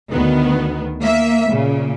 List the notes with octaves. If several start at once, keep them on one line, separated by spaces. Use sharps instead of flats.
D2 D#3 B3
A#3 E5
A#2 C#3